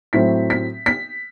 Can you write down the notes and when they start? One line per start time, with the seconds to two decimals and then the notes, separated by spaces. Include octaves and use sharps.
0.13 A2 F#3 A3 C4 B6
0.50 B6
0.86 B6